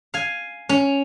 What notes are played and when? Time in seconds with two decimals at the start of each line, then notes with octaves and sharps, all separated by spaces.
0.14 F5 G#5
0.69 C#4